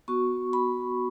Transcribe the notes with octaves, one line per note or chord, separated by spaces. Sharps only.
B3 F#4 C#6
B5